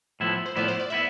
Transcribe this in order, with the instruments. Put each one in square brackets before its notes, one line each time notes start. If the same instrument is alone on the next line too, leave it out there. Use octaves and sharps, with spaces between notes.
[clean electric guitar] A2 F3 B3 E4
[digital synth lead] C5
[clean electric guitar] A2 F3 B3 E4 [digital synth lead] D5
[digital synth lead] C5
D5
[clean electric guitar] B3 E4 [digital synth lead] E5